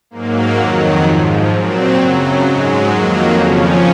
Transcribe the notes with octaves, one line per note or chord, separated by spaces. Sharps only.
G#2 F#3 A#3
F2 D#3 F#3
G#2 F3
A#2 F#3 C4
F#2 C#3 F#3
G#2 F#3 G#3
F2 D#3 F#3 A#3
F2 C#3 F3 C#4